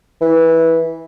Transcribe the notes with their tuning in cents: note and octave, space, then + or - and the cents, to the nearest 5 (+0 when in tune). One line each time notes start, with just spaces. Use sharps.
E3 -15